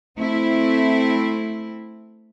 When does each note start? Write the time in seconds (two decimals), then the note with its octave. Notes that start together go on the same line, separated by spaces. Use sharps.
0.17 A3 C4 E4